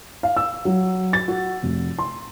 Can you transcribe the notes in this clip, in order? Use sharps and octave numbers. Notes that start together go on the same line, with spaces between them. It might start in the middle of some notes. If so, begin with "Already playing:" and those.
F5
E6
F#3
A6
F#4
F1
C6